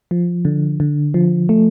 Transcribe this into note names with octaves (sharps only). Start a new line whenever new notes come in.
F3
D3
D3
F3
A3